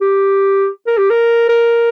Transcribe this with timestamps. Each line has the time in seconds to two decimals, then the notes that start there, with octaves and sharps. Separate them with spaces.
0.01 G4
0.87 A#4
0.98 G4
1.10 A#4
1.49 A#4